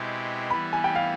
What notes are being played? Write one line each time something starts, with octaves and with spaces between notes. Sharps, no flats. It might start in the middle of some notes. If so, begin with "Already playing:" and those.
Already playing: B2 G#3 C4 E4 G4
E3 G3 B3 E4 B5
G#5
G5
F5